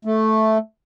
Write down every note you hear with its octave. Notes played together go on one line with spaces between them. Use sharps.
A3